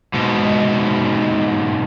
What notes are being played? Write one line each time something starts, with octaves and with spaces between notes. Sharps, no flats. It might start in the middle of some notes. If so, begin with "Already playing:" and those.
G#2 B2